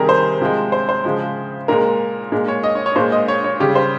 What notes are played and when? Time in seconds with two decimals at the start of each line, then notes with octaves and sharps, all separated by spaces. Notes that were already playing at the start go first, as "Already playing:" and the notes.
Already playing: C3 D#3 G3 G#4 A#4
0.09 C5
0.41 C3 F3 G#3
0.72 C5
0.89 C5
1.04 C#3 F3 G#3
1.68 A#2 G#3 A#4
2.32 A#2 G#3
2.48 C#5
2.63 D#5
2.75 C#5
2.86 C#5
2.96 A#2 G#3 C5
3.12 D#5
3.28 C#5
3.44 C#5
3.60 C#3 G3 G4
3.75 C5